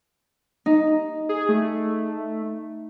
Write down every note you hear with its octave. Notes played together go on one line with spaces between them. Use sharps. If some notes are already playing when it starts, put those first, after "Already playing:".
D#4
G#4
A3